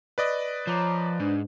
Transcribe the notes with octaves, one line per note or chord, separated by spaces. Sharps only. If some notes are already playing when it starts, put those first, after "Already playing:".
B4 D5 D#5
F3 C#5 A#5 D6
G#2 D4